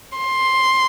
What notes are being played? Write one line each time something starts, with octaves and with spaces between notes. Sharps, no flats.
C6